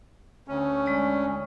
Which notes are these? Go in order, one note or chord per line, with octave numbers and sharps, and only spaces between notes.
D2 C#4
G#3 D5